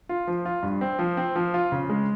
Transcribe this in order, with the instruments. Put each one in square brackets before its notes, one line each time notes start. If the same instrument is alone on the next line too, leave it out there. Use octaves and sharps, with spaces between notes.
[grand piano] F4
F3
F4
G2
C4
F3
C4
F3
F4
C#3
G#3